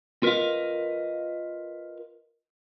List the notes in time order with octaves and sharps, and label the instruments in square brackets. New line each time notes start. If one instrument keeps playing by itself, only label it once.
[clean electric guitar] F4 A#4 B4 D5 D#5 F5